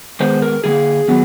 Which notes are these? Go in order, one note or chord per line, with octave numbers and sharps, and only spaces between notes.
D#3 G#3 B3 C5
A#4
D3 G3 A#3 G#4
D#3 F#3 B3